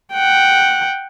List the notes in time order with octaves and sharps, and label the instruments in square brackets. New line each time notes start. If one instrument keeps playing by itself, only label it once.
[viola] F#5 G5